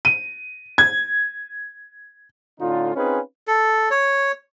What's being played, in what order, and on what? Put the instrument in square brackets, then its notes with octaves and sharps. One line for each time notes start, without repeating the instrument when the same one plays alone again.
[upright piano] D#7
G#6
[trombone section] A2 D3 C#4 D#4 F4
C4 C#4 D#4 F4 G#4 B4
[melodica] A4
C#5